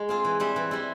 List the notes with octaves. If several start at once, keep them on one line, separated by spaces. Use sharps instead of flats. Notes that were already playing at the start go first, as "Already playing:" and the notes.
Already playing: G#3
C4 F4 G#4
E3
G3 C4 E4
E3
G3 C4 E4